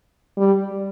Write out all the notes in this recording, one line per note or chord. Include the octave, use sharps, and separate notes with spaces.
G3